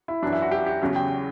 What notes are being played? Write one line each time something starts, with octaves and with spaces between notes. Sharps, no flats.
E4
F#2 E3 D4
E4
F#4
G4
G4
E2 C#3 F#3
G5